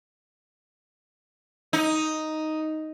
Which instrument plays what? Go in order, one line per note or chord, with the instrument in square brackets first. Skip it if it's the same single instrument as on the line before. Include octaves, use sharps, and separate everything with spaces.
[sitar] D#4